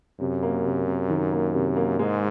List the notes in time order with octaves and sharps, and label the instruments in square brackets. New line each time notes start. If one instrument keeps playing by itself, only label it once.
[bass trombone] F#2 [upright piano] C3
[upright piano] A#3
C3
C3
D#3
A#3
C3
A#3
[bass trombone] G#2 [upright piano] G#3